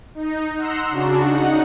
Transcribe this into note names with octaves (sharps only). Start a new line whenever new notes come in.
D#4
F#5 A#5 C6 E6
C#3 D4 F#4
D#4 F#5